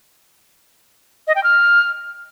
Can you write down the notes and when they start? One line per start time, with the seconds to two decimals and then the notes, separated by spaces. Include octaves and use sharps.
1.27 D#5
1.36 G5
1.44 F6